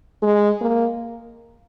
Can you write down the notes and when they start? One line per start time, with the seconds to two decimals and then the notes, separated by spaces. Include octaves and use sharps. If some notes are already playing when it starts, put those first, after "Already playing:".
0.22 G#3
0.61 A#3